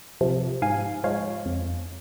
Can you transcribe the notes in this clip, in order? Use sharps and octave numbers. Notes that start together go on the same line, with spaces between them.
C3 F3
G#2 F5 G#5
F3 G#3 C#5 F5
F2